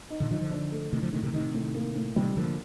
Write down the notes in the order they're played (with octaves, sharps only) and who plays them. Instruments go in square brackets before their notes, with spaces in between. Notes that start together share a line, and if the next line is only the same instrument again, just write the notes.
[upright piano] D#4
[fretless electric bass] A#2 D3
[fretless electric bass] D3 F3 [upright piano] D#4
[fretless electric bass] D3 F3
[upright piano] D4
A3
[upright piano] A2 [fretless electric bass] C3 D#3
[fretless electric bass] D3 F3
[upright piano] A2 [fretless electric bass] C3 D#3
[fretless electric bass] C3 D#3
[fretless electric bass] C3 D#3 [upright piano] D#4
[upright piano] A2
A#3
A2
[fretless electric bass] C3 D#3 [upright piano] G3
[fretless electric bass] D3 F3 [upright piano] A#3